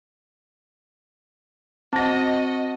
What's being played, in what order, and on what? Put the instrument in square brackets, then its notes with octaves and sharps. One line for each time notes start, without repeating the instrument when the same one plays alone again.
[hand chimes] C4 [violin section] F#4 D#5 [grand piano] A5 A#6